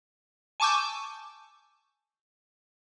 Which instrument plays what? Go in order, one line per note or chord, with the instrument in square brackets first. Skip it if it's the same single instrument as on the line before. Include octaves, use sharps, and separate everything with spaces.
[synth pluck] G#5 A5 C#6 D6 E6 G6